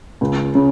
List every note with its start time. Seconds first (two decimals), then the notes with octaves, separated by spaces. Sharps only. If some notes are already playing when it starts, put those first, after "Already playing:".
0.21 C#2
0.55 C#3